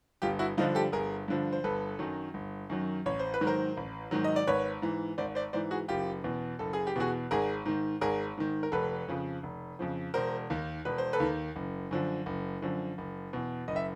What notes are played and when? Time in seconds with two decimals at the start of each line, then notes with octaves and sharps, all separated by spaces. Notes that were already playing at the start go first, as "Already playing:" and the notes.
0.22 G1 F4 G4
0.39 E4 F#4
0.57 G2 D3 F3 D#4 F4
0.75 G4 A4
0.92 G1 G#4 A#4
1.28 G2 D3 F3
1.53 C5
1.64 G1 A4 B4
1.99 F#2 D#3 F#3
2.34 G1
2.70 F#2 D#3 F#3
3.06 A1 C#5
3.19 C5
3.34 B4
3.41 G#2 D#3 F#3
3.47 A#4 C5
3.77 A1
4.11 G#2 D#3 F#3
4.24 D#5
4.36 D5
4.47 G#1 B4 C#5
4.82 G#2 E3
5.18 G#1 C5 D5
5.35 C5 D5
5.53 G#2 E3 C5 D5
5.71 F#4 G#4
5.88 F#1 F4 G4
6.24 E2 B2
6.59 F#1 A4
6.73 G#4
6.87 G4
6.96 E2 B2 F#4 G#4
7.31 G#1 G#4 A#4
7.66 G#2 D#3
8.01 G#1 G#4 A#4
8.38 G#2 D#3
8.63 A#4
8.72 F1 A4 B4
9.08 F2 C#3 F3
9.43 F1
9.79 F2 C#3 F3
10.14 E1 A#4 C5
10.50 D#2 D#3
10.85 E1 B4
10.98 C5
11.13 A4 B4
11.20 D#2 D#3
11.56 F#1
11.91 F#2 D3 F3
12.26 F#1
12.62 F#2 D3 F3
12.98 F#1
13.33 E2 B2
13.68 F#1 D#5
13.76 E5